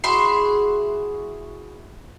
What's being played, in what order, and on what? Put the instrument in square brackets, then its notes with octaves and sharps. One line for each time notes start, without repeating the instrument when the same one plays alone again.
[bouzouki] E4 F#4 G#4 [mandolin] E5 C6